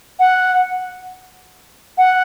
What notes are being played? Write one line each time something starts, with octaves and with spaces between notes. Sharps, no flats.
F#5
F#5